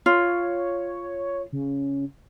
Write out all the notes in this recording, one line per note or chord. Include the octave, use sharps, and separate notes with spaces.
F4 C#5
C#3